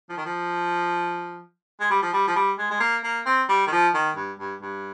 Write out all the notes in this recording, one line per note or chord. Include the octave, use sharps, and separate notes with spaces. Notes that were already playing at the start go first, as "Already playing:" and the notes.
F3
D#3
F3
G#3
G3
F3
G3
F3
G3
G#3
G#3
A#3
A#3
C4
G3
D#3
F3
D#3
G2
G2
G2